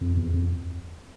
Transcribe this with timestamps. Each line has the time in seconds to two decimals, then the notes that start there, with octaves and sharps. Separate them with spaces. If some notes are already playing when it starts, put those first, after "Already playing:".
0.01 F2
0.17 E2
0.33 F2